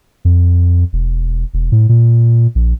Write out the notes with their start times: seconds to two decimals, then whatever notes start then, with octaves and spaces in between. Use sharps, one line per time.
0.25 F2
0.93 E1
1.54 E1
1.72 A2
1.89 A#2
2.55 A#1